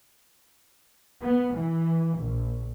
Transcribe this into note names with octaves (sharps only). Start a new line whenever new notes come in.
B3
E3
A#1